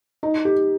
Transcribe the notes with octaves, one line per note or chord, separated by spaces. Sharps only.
D#4
G4